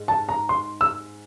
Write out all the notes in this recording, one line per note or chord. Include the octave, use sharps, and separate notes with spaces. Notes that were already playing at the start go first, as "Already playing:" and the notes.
Already playing: G#2
A5
A#5
C6
E6